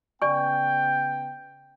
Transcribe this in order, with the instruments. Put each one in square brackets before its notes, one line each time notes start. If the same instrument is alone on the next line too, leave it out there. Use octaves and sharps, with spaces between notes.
[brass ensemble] C#3 B3 G5 [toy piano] D5 G#5 C#6